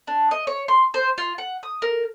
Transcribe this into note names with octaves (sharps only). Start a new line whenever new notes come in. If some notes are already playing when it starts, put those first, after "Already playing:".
D4
D#5
C#5
C6
C5
F4
F#5
D#6
A#4